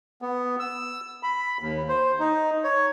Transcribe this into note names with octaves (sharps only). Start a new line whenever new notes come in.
B3
E6
B5
D#2
C5
D#4
C#5